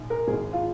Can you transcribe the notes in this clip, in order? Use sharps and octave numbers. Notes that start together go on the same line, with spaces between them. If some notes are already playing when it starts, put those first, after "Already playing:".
Already playing: A#1 G#2
A#4
G#1 G#2 D#3 G#4
F4